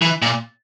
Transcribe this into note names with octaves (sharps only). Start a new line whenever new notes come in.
E3
A#2